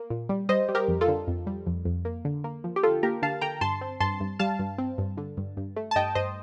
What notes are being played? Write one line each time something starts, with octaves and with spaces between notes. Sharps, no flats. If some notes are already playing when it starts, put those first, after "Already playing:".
Already playing: A#3
A#2
G3
G3 C5 D#5
G3
G4 A#4
F2
F4 A4
D3
F2
G3
F2
F2
A#3
D3
A#3
F3
G4
D3 F4 A4
A#3 G4 A#4
D3 F5 A5
D3 G5 A#5
G2 A5 C6
C4
G2 A5 C6
G2
G3 F5 A5
G2
C4
G2
D3
G2
G2
A3
A5
G2 D#5 G5
G2 C5 D#5